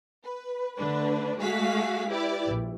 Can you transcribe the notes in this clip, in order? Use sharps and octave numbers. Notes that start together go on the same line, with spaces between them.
B4
D3 A3 D4 B4
G#3 A3 F#4 G#4 F5 B6
E4 G4 B4 D5
A#1